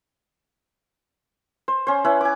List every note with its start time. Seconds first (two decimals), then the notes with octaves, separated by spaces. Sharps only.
1.68 C5
1.87 C#4 C5
2.04 C#4 E4 B4
2.21 G#5 D6